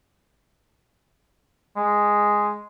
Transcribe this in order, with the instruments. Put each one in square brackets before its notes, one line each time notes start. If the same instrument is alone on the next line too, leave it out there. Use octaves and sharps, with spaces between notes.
[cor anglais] G#3